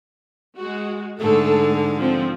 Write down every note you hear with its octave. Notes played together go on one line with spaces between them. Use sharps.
G#3 F#4
G#2 D3 A3 A4
F3 C4